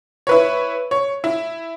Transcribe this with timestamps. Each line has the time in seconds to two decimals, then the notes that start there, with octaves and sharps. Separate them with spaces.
0.27 E4 B4 C#5
0.91 C#5
1.24 E4